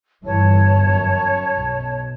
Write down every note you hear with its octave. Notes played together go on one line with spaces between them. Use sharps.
G1 G2 E3 C#5 A5
F#2
B1